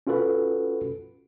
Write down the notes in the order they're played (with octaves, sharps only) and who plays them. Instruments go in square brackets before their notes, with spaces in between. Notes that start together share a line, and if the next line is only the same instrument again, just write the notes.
[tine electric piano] C#4 F4 F#4 A4 B4